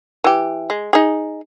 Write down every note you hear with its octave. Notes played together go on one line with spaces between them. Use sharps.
E3 G4
G#3
D#4 G#4